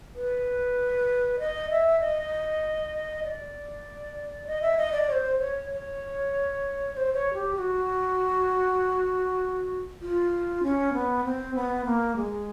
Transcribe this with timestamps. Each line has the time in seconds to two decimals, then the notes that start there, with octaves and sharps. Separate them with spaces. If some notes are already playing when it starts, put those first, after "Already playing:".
0.15 B4
1.39 D#5
1.70 E5
2.00 D#5
3.24 D5
4.47 D#5
4.62 E5
4.77 D#5
4.92 D5
5.08 C#5
5.12 C5
5.39 C#5
5.70 C#5
6.94 C#5
6.97 C5
7.13 C#5
7.34 G4
7.55 G4
7.58 F#4
10.01 F4
10.63 C#4
10.94 B3
11.24 C4
11.55 B3
11.85 A#3
12.16 G#3